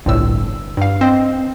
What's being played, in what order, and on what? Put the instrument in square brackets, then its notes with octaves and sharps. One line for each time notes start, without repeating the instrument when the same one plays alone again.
[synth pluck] G1 C2 A2 E6
G2 F5
C4 D#5